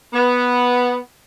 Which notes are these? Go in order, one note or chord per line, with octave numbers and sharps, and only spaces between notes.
B3